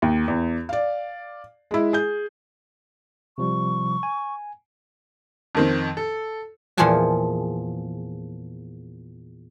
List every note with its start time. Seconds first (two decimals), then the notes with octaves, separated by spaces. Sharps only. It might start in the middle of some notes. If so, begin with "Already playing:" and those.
0.02 D#2
0.28 E2
0.69 D5 F5
1.71 G#3 E4
1.93 G#4 G6
3.38 C3 F3 G3 C#6
4.03 G#5
5.55 F2 D#3 C4
5.97 A4
6.77 E2 A#2 F3 G#4 G#5 A5